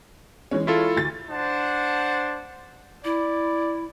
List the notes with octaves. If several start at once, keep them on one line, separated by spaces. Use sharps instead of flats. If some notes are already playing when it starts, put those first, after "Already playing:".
E3 G#3 C#4
E4 F4 A4
D2 A6
D4 C5 F#5 A5
E4 D5